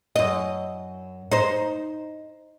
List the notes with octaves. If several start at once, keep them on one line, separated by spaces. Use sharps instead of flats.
F#2 D#5
D#4 C5